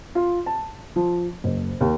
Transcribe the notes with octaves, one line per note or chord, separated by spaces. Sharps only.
F4
A5
F3
F#1
D#2